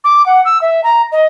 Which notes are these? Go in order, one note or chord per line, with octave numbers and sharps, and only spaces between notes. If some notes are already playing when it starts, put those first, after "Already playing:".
D6
F#5
E6
E5
A#5
D#5